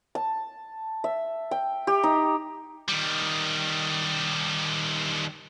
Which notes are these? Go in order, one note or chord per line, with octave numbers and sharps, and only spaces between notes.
A5
E5
G5
G4
D#4
D#3 G3